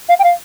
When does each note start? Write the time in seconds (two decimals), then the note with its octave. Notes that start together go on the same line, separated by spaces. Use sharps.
0.09 F5
0.19 G5
0.24 F5